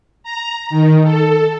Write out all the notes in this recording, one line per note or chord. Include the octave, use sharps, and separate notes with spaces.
A#5
D#3
A4